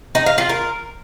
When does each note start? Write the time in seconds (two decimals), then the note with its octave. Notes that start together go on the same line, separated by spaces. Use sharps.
0.15 D#4
0.26 F5
0.38 F4
0.49 A#4